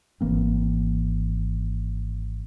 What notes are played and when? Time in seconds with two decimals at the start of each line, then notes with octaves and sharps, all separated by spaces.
0.21 G#1 E3 A#3 C4